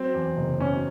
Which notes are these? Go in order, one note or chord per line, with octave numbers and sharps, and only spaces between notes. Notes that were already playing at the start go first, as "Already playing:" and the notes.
Already playing: F#3 C4
E2
F#1
B2 C#4